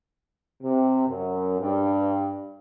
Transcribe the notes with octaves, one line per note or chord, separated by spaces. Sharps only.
C3
F#2
G2